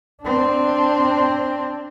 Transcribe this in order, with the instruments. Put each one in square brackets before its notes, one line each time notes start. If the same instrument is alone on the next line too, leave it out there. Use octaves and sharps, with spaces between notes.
[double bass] C4 D4